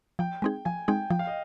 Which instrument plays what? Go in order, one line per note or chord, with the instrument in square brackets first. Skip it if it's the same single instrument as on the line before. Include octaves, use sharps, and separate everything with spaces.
[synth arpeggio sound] F3 [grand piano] G5
[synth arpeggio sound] G#3 C4 D#4 G#4
[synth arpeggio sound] F3 [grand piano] G#5
[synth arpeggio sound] G#3 C4 D#4 G#4 [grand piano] G5
[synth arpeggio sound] F3 [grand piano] G5
[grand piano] F5
D#5